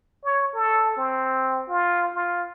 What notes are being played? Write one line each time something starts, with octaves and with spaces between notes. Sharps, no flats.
C#5
A4
C4
F4
F4